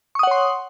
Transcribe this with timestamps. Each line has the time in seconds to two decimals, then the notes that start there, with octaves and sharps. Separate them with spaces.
0.15 C#6
0.19 D#6
0.23 F#5
0.27 C#5
0.31 C6